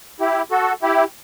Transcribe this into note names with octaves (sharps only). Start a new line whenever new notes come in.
E4 G4
F#4 A4
E4 G4